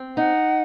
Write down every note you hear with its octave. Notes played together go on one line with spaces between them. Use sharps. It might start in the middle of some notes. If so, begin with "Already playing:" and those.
Already playing: C4
D#4 F#5